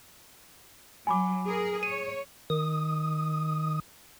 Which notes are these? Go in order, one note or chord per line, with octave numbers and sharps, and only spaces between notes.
F#3 G#5 B5 D6
G#4 A#4
C#5 D#7
D#3 D#6